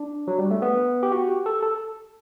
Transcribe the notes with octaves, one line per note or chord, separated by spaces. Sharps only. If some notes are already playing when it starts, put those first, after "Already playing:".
Already playing: D4
F#3
G3
A3
B3
G4
F#4
G4
A4
A4